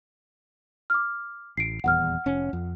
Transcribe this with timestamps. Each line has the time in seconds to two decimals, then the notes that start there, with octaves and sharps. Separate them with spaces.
0.90 D6 F6
1.57 A1 C7 D7
1.84 D#1 E2 F#5 F6
2.26 F1 C#4
2.53 F2